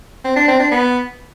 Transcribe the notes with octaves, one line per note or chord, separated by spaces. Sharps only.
C4
D4
C4
D4
B3